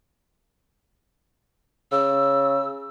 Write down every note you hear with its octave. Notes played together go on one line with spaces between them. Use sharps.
C#3 E6